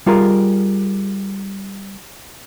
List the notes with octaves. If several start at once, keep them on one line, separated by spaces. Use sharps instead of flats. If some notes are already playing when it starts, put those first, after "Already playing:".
G3 F4 G#4 A#4